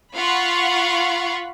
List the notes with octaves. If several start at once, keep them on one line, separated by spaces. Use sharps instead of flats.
F4 F5 F#5 B5 C#6